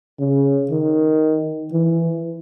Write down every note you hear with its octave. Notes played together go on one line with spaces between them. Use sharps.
C#3
D#3
E3